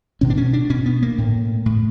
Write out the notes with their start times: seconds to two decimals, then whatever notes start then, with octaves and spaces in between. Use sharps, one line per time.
0.21 B2 C#4
0.30 D4
0.37 C#4
0.53 D4
0.70 B2 C#4
0.86 B3
1.03 A#3
1.18 A2
1.66 A2